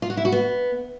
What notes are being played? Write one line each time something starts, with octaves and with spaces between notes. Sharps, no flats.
F4
F#4
E4
F#4
B3